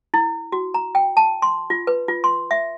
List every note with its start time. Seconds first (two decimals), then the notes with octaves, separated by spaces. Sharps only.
0.14 E4
0.52 F#4
0.74 A#5
0.95 G5
1.17 A5
1.42 C6
1.70 F4
1.87 B4
2.08 F4
2.24 C6
2.51 E5